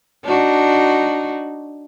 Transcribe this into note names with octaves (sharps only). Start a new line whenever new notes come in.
D4 D#4 F#4